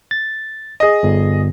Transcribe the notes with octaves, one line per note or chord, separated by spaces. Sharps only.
A6
G#4 D#5
G1